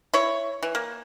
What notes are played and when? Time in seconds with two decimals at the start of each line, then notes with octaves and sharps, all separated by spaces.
0.14 E4 C#5
0.63 E3
0.75 A#3